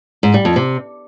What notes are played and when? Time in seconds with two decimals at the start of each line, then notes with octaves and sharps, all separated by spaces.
0.23 G#2
0.34 G3
0.45 F2
0.56 C3